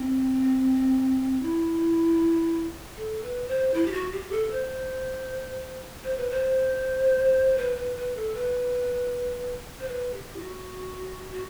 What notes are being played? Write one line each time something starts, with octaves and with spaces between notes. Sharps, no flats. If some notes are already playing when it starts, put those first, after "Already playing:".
Already playing: C4
E4
A4
B4
C5
E4
G4
F#4
G4
A4
C5
C5
B4
C5
B4
B4
B4
A4
B4
C5
B4
G4
E4
F#4
F#4